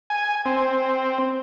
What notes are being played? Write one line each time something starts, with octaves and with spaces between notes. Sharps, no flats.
G#5
C4